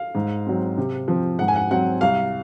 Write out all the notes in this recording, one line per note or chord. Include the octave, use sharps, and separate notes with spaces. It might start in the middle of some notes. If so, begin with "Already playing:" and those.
Already playing: F5
G#2
F#3 C4
C3
F3 C4
G#2 F#5
G#5
F#5
F#3 C4 F#5
C2 F5